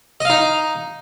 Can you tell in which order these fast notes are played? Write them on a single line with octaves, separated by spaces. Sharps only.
D#5 F5 D#4